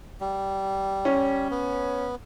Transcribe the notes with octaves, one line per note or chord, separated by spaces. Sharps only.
G3
C#4
B3